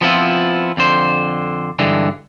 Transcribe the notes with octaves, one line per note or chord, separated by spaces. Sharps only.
F3 B3 C4 E4 F4
F2 D3 C5
G2 D3 E3 G#3